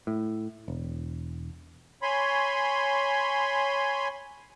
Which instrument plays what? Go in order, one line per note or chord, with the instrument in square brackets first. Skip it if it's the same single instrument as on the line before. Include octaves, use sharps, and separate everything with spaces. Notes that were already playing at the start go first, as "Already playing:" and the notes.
[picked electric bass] A2
E1
[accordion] C#5 G#5 B5 C6